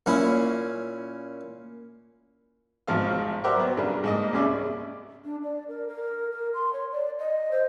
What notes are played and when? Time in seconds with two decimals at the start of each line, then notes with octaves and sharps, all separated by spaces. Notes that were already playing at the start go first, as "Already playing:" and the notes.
0.06 A#2 C#4 E4
2.87 G#1 G#2 B2 F3 F5 F6
3.44 F#4 G4 A#4 C5 D5 E5
3.56 F#3 B3
3.77 G2 C#3 D4 A#4
4.04 G#2 A#3 D#5
4.33 C2 C#3 C#4 D5 E5
5.25 D4
5.43 D5
5.68 A#4
5.88 A#4
6.31 A#4
6.54 C6
6.73 C#5
6.92 D5
7.19 D#5
7.51 C5